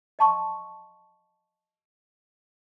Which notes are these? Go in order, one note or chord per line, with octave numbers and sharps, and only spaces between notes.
D#5 F5 A5 C6 C#6